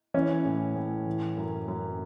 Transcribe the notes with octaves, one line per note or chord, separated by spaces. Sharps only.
E3 C#4
A2
A2
E3
F#2
F#2